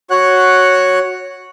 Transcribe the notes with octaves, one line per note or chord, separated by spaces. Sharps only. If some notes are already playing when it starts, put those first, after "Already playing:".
F#4 C#5 F#5 F#6